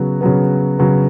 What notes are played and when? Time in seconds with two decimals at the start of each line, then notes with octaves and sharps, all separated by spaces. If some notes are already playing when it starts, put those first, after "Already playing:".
Already playing: C#3 F#3 B3
0.21 C#3 F#3 B3
0.79 C#3 F#3 B3